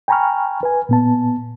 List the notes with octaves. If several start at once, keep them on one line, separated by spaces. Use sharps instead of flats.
G5 G#5 A#5 B5 C#6 F6
B4 G#5
A#2 B3 A5